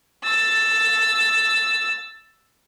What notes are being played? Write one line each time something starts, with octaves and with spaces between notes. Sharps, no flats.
E6 A6